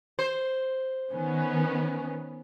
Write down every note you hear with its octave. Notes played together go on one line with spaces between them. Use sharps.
C5
D#3 B3 C#4